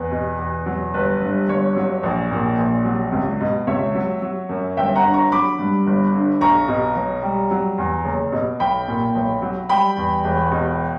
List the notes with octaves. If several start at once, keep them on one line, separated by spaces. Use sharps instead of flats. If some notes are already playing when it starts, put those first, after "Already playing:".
Already playing: E2 B4
B2
E2
F#3
G1 B4
G2
G1 C#5
F#3
A#1
A#2
A#1
F#3
C#2
B2
C#2 C#5 E5
F#3
F#3
F#2
G1 E5 G5
F#5 A#5
D3
A#5 C#6
F#3 B5 D6
G2
G1
D3
B1 A#5 C#6
B2
B1
G3
F#3
E2
F#1
B2
B1 G5 B5
A#2
B1
F#3
G3 G5 B5
E2
E1
B2